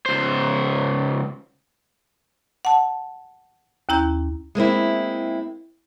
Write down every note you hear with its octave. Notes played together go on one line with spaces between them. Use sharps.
C#2 C5
F#5 A5
D#2 C#4 E4 A#5 G6
G#3 A#3 C4 E4